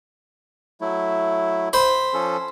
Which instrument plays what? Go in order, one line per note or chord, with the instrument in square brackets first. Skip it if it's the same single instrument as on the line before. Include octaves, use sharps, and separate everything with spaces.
[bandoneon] F#3 A3 E4
[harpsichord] C5 B5
[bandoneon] F3 C#4 A4